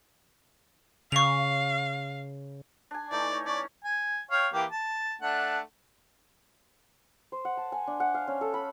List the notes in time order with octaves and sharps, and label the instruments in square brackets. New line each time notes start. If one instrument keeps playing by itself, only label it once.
[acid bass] C#3 [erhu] F5 [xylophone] C#6 F7
[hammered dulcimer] D4 G#5
[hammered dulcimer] E3 A3 D#4 [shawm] D5
[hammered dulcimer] C#5
[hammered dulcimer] C#4 [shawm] D5
[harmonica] G#5
C#5 F5 G5
E3 A#3 G4
A5
A3 D4 F#5
[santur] C5
F#5
A5
G#5
D4
F#5
F5
C#4
A4
B5